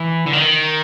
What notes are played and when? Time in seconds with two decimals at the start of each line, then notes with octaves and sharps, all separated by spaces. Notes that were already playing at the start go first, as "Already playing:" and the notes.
Already playing: E3
0.26 D3
0.33 D#3